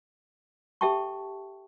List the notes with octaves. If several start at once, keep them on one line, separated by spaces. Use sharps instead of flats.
G4 A4 E5 G5 A5 C#6